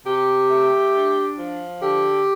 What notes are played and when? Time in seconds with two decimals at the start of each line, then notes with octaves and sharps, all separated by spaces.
0.06 C3 G4
0.50 A3
0.94 D4
1.38 F3
1.81 D3 G4